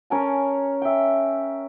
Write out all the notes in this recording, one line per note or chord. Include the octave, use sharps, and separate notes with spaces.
C#4 A#4 G#5 A5
E5 G5